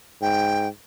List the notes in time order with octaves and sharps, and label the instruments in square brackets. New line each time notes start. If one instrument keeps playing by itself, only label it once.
[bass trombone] G#2 [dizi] G5